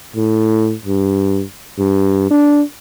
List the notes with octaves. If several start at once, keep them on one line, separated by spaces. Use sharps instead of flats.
A2
G2
G2
D4